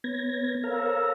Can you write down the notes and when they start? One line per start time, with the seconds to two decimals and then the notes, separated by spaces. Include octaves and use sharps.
0.04 B3 C#5 G#6 A#6
0.34 A#4 C#5
0.64 A4 A#4 C5 C#5 F5 A#5